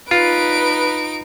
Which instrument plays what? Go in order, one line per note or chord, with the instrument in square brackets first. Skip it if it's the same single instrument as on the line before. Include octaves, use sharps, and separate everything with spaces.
[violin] D#4 D7 [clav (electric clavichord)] F4 [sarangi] B4